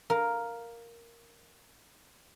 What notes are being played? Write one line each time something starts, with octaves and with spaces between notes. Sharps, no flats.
A#4 F5